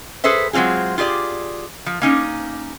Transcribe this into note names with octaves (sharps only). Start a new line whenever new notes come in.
G#4 A4 B4 C5 E5
F#3 G#3 C4 F4 G#4
F4 G4 G#4 D5
F3
A#3 C#4 D#4